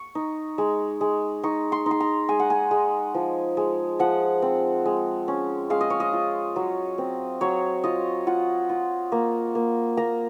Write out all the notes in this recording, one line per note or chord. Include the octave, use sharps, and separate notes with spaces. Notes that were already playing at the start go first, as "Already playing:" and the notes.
Already playing: C#6
D#4
G#3
G#3
D#4 C#6
C6
D#4 C6
A#5
G#3 G#5
F#5
G#5
G#3
F3
G#3
F3 F#5
C4
G#3
C#4
G#3 F5
D#5
C#5
D#5
F4
F#3
C4
F#3 C#5
F4 D#5
F4 F#5
F4
A#3
A#3
A#3 A#5